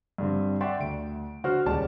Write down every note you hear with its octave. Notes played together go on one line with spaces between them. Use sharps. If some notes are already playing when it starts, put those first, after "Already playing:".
G2 D3 C4
D5 E5 F#5 G5 C6 C#6
D2 D7
D3 F#4 C5 F6
D#1 C#2 D5 A5